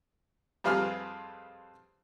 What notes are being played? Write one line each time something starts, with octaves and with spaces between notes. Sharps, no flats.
F2 G3 F4 G#4 B4 F6